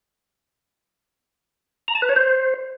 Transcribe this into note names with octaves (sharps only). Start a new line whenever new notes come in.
A#5
A5
B4
C#5
C5